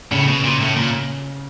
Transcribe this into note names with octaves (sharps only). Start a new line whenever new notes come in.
A2 C#3
B2
A#2
A2
A#2